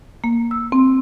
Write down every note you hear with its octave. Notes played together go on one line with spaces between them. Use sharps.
A#3
E6
C4